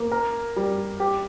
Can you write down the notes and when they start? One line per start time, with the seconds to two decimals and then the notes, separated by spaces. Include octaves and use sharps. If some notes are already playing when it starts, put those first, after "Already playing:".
Already playing: A#3
0.12 A#4
0.56 G3
1.00 G4